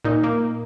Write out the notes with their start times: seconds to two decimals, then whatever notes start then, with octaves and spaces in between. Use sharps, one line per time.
0.04 A#2 D#4
0.24 A#3